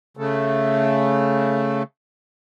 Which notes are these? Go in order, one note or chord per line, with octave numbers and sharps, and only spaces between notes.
C#3 A3